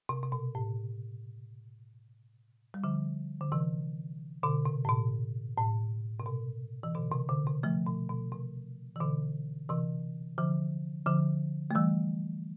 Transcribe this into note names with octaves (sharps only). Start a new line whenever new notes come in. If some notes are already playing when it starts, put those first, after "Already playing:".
C3
C3
B2
A2
G3
D3 F3
D3
C3 E3
B2 D3
C3
A2
B2
A2
C3
B2
E3
B2 D3
C3
B2 D3
C3
F3 A3
B2
B2
C3
E3
B2 D3
C3 E3
D3 F3
D3 F3
A3
E3 G3